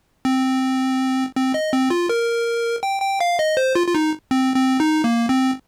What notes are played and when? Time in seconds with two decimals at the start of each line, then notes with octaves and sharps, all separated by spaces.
0.25 C4
1.36 C4
1.54 D#5
1.73 C4
1.90 F4
2.09 A#4
2.83 G5
3.02 G5
3.20 F5
3.39 D#5
3.57 C5
3.75 F4
3.87 F4
3.95 D#4
4.31 C4
4.56 C4
4.80 D#4
5.04 A#3
5.29 C4